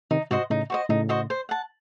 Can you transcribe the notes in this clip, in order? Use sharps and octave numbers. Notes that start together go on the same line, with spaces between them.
C3 D#3 D#4
G#2 C3 F#4 C5 D#5
A2 C#3 D#4
F#4 C5 D#5
A2 C#3 D#4
F#4 C5 D#5
C5
F#5 A5